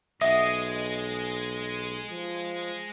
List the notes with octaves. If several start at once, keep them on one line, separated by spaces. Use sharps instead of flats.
B1 G#3 D#5 E5 F#5
F3